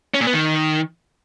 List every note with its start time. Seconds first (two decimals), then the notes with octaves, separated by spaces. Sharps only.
0.14 C#4
0.21 A#2
0.27 B3
0.33 D#3